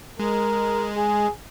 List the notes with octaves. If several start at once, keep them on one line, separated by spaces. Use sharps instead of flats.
G#3 A#4
G#4